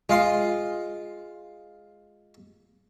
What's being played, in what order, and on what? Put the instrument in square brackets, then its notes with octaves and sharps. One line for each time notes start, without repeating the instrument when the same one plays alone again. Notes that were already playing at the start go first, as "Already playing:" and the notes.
[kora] G#3 [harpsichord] F4 F5 C6